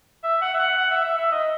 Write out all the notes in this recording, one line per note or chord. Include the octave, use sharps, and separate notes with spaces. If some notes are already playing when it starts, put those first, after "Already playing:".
E5
F#5
E5
F#5
F#5
E5
E5
E5
D#5